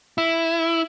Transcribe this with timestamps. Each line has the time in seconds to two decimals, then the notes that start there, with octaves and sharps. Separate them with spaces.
0.18 E4